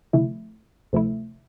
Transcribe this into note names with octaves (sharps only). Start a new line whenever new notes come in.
D2 C3 F3 A3 E4
D2 C3 F3 A3 E4